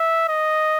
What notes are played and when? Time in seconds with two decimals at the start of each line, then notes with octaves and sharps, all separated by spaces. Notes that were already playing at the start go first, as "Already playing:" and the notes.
Already playing: E5
0.29 D#5